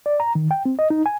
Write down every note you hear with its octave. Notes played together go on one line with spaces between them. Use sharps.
D5
A#5
D#3
G5
C4
D#5
D#4
G#5